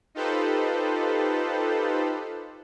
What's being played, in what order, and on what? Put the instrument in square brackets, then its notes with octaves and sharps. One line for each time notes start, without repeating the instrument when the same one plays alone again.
[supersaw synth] D#4 F4 G4 A4 B4 C5